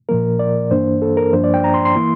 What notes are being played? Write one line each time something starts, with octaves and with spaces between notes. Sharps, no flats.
A#2 F3 A#3 A#4
D5
G2 E3 A#3 D4 C5
A4
A#4
G2 F3 A#3 D4 C5
D5
G5
A#5
C6
C6
E3 A#3 E4